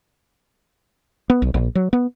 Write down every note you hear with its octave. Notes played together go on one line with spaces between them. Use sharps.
B3
B1
A#1
F#3
B3